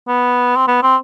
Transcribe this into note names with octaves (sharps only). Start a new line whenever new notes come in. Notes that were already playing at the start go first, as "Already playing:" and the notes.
B3
C4
B3
C4